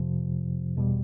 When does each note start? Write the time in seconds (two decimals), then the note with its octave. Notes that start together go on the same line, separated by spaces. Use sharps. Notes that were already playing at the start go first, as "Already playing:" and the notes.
Already playing: F2 C3 F3
0.77 E2 B2 G3